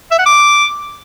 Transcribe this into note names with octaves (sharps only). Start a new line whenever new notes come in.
E5
F#5
D6